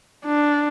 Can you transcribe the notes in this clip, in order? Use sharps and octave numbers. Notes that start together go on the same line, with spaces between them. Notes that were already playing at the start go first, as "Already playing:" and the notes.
D4